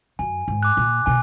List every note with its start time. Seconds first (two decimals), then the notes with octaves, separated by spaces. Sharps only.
0.19 F#2 G#5
0.48 G#2
0.63 D6 F#6
0.77 A#2
1.06 B2 G#5